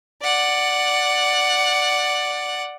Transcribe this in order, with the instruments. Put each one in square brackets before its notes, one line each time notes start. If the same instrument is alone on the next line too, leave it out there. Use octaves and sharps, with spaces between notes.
[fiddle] D5 F#5